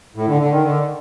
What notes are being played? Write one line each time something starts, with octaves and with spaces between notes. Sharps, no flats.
A2
D3
D3
D#3
D3